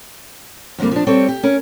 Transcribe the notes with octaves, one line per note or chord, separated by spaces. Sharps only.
F2 D3 D#3 G3 A#3
F3 D4
G3 C4 A4 C#5
G4
C#4 A#4